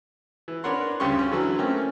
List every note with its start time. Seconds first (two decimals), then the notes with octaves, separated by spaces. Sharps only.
0.48 E3
0.64 D4 A#4 B4 C#5 F#5 C6
1.00 D2 G2 C#3 G4 C6 C#6
1.19 C#4
1.32 D3 E3 F#3
1.57 A3 A#3 C4 C#4 F4